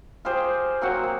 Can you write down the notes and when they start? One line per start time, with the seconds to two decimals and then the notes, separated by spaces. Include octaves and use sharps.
0.25 F4 G4 G#4 C5
0.81 F#3 A#3 C4 F#4
1.03 A#3